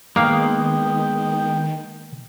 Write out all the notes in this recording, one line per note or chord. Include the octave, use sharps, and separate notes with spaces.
D#3 G#3 A#3 B3 F5 G5